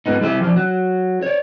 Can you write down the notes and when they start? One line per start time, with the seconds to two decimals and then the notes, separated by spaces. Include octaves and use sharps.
0.06 G#2 B3 D#4
0.21 G3 E4 C5 E5
0.41 F3 D4
0.56 F#3
1.22 C#5 D5